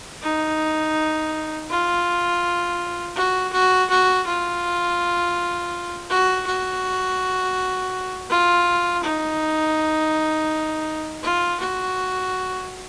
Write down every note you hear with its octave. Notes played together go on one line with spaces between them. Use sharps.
D#4
F4
F#4
F#4
F#4
F4
F#4
F#4
F4
D#4
F4
F#4